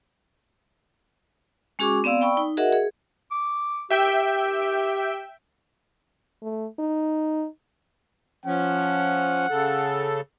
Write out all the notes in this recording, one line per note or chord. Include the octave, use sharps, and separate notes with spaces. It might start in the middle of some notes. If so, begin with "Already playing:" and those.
G#3 C#4 F#4 G#4 C#6 D6
B3 C4 D5 F5 E6
D5 G5 B5 C#6 E6
D#4
F#4 G#4 A#4 D#5 E5 F#5
G#4
D6
G4 E5 G5
A3
D#4
F3 C#4 F#5
C#3 A4